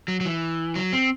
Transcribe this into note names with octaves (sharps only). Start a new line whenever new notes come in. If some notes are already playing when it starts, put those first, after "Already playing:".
F#3
F#3
E3
F#3
C4